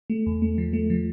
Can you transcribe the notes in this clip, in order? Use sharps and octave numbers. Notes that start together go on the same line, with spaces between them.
A3
E2
A3
F3
A3
F3